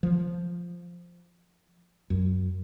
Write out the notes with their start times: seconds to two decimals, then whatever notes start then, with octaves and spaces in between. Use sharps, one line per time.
0.03 F3
2.10 F#2